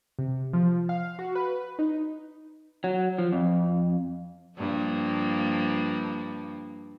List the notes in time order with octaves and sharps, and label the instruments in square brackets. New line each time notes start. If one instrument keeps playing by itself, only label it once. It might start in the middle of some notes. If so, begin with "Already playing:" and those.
[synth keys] C3
F3
F5
F#4
B4
D#4
[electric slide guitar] F#3
F3
F2
[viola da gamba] G2 F3 A#3